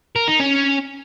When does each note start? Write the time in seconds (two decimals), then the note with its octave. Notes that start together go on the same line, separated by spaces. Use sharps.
0.16 A#4
0.28 D#4
0.40 C#4